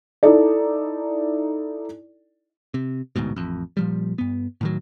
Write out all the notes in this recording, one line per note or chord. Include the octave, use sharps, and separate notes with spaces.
D#4 E4 A4 D5
C3
A1 D2 G#2 B2
A1 F2
A#2 F3 G3
G2 B3
A2 D#3 F#3